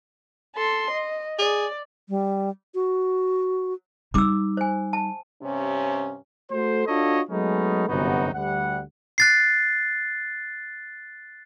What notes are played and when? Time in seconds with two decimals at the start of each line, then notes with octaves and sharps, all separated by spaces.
0.56 A4 C6
0.90 D#5
1.39 G#4 D5
2.09 G3
2.75 F#4
4.14 G3 D#4 D6 E6
4.57 C5 G#5
4.93 A5
5.41 G2 C3 C#4
6.51 A3 F#4 A4 C5
6.87 D4 F4 F#4 A4 C#5 D#5
7.29 F#3 G#3 A3 B3 C#4 D#4
7.88 G1 F#2 C3 B3 D#4 F#4
8.33 D2 G3 F#5
9.18 F#6 A6 C7